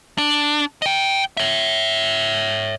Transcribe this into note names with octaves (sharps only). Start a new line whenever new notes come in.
D4
D#5 G5
C#5 E5